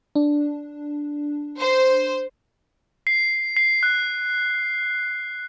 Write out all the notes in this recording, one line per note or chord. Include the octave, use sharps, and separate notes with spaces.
D4
C5
C7
C7
F#6